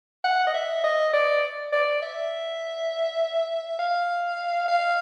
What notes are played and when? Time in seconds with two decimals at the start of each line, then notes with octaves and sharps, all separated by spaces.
0.24 F#5
0.47 D#5
0.54 E5
0.84 D#5
1.14 D5
1.73 D5
2.02 E5
3.79 F5
4.68 F5